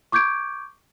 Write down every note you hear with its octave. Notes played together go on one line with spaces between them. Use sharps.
C#6 D6 G6 G#6 D7